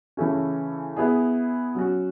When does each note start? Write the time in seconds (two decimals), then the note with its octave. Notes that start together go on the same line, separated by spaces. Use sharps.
0.17 C#3 E3 A3 C#4
0.97 B3 E4 G#4
1.75 F#3 C#4 F#4